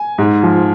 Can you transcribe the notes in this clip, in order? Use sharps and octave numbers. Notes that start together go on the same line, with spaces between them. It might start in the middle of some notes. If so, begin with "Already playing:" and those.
Already playing: G#5
G#2
F3